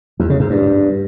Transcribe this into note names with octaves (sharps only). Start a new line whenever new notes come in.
E2
C#3
G#2
G2